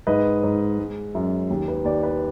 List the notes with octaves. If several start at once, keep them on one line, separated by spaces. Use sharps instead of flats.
G#2 B4 D#5
G#2
G#3
F#2
D#2
B4
D#2 D5
B4